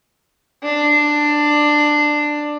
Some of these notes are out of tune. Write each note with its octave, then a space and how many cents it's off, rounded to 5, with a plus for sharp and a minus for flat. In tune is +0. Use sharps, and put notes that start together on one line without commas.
D4 +10